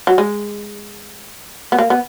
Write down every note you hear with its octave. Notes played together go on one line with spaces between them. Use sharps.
F#3
G#3
B3
A#3
B3